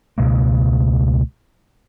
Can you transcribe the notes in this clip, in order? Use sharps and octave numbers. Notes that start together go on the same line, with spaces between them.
C#2 B2 G#3 A#3